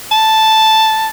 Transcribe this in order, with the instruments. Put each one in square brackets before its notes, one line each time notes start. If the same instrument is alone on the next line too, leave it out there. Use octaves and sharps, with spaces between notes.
[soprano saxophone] A5